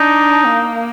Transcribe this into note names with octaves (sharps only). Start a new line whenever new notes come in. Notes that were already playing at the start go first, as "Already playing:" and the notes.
Already playing: D4 D#4
A#3